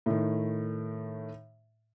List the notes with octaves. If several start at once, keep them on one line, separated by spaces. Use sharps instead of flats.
A2 D#3